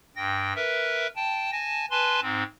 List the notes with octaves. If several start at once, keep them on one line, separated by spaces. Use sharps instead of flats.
G2 G5 A#6
A#4 B4 E5
G5 A5
G#5 A5 A#6
B4 G#5 A5 C6
G#2 C4